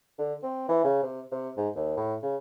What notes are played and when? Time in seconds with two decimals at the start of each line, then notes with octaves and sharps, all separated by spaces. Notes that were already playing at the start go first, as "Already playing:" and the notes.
0.18 D3
0.43 C4
0.69 E3
0.84 C#3
1.03 C3
1.32 C3
1.57 G#2
1.75 D#2
1.97 A2
2.22 C#3